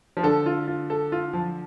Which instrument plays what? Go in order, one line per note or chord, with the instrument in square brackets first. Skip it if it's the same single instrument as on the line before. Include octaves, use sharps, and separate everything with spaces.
[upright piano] F3
[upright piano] D3 [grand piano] A4
[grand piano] F4
F4
A4
F4
F3